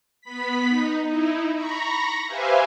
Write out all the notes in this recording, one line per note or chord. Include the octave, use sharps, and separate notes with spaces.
B3 B5 B6
D#4
D#4 E4
A#5 B5 C#6 A#6
G4 B4 C5 E5 F5 G#5